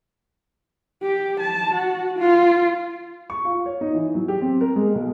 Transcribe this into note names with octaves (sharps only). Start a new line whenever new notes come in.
G4
A5
F#4
F4
C#6
F4
C#5
D#4
E3
F#3
G4
C4
A#4
G#3
B1